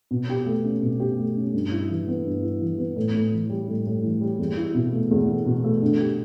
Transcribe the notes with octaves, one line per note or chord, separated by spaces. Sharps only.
B2
G4
A3
C#4
B2
G4
A3
C#4
G2
E4
E3
B3
G2
E4
E3
B3
A2
A2
E3
G3
A2
A2
E3
G3
E2
E4
B2
A3
E2
E4
B2
A3
D3
G4